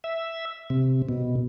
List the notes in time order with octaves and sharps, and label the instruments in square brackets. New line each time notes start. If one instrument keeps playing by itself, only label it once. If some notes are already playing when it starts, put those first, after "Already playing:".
[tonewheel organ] E5
C3
B2